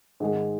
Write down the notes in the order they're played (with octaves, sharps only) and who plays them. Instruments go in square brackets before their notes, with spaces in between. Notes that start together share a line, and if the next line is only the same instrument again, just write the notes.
[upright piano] G#2 D#3 G#3